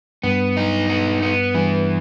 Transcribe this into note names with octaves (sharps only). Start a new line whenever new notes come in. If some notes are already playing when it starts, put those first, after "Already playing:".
G2 B3
D#4
B3
B3
G2 E3